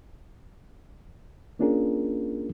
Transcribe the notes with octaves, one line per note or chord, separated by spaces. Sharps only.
A#3 C#4 D4 F4 G#4 A#4